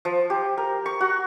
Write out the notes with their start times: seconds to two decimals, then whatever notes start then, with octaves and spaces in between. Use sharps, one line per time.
0.05 F3
0.30 G4
0.58 A#4
0.86 C#6
1.00 F#4